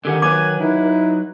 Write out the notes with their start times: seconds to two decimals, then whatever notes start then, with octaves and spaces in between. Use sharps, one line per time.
0.05 D3 D#3 G4 F#5 G#5
0.22 F#3 B4 G#5 D6
0.60 D#4 E4